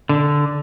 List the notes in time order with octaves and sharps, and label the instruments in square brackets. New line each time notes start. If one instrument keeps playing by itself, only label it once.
[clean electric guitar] D3